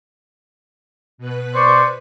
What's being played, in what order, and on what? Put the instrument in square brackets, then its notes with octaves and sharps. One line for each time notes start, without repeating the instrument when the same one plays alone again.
[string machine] B2 B4 F#6
[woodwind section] C5 D5 C#6